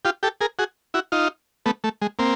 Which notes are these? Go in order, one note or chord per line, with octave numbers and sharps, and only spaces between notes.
F4 G4
G4 A4
G#4 A#4
F#4 G#4
E4 F#4
D#4 F4
A3 B3
A3
G#3
A#3 C4